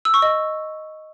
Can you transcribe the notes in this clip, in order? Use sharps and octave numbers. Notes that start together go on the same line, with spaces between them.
E6
C#6
D#5